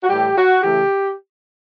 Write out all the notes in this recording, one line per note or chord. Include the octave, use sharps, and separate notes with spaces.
F#4
A2 E3 G3 G4
F#4
C#3 E3 A3 G4